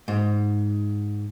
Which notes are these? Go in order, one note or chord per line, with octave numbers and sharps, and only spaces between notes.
G#2